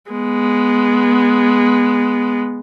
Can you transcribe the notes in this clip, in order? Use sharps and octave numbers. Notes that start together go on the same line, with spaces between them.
G#3 B3